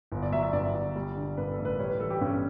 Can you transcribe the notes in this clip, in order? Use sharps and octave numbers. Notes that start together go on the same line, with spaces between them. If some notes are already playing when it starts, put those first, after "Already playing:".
G1
D5
F#3 E5
E5
G2 D5
G1
G3
D3
G2 B4
A4
A1
B4
G3 C#5
B4
E3 A4
G4
G2 C#4